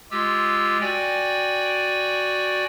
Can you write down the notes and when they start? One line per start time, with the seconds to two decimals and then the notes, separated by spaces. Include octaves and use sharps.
0.11 G#3 F4 G4 E6
0.81 F#4 D5 G5 G#5